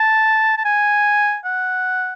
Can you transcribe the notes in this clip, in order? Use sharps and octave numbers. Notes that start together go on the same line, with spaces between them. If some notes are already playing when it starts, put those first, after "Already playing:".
Already playing: A5
A5
G#5
F#5